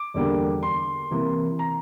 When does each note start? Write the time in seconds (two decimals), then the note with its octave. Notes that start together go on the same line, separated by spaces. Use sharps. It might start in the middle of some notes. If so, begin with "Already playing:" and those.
Already playing: D6
0.14 E2 D3 G3 A#3
0.63 C6
1.11 C3 E3 A#3
1.59 A#5